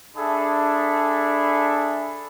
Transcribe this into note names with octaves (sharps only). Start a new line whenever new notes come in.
D4 G#4 A4 E5 B5